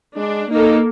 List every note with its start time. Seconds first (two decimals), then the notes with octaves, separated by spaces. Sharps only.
0.16 G#3 D4
0.51 A#3 D#4 A4